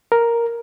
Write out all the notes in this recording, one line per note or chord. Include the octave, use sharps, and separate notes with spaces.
A#4